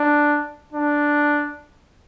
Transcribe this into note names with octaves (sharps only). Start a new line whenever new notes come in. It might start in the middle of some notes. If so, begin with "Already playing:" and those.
Already playing: D4
D4